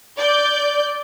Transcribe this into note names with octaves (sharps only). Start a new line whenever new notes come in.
D5 G6